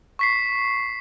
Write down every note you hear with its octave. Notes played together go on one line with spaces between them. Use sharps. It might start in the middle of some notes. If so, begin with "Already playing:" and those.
C#6 B6 C7